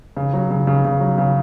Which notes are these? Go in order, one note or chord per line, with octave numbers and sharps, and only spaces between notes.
C#3
F#3
C#3
C#3
C#3
F#3
C#3